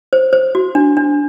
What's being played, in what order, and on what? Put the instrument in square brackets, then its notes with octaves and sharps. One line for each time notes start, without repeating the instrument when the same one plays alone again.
[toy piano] C5
C5
F#4
D4
D4